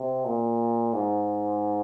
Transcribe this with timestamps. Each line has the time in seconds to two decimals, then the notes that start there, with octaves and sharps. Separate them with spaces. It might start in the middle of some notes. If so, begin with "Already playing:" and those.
Already playing: C3
0.25 A#2
0.93 G#2